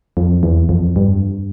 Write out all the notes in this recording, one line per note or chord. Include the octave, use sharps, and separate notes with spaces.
F2
E2
F2
G2